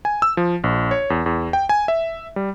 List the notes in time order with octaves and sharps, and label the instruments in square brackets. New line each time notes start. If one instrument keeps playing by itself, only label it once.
[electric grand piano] G#5
E6
F3
A#1
C#5
E2
E2
G5
G#5
E5
G3